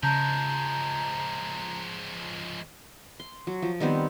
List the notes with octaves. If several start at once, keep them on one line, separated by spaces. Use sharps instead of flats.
C#3 F3 G#3 A5 A#5 G6
C6
F#3
F3
D#3 G3 B3 C4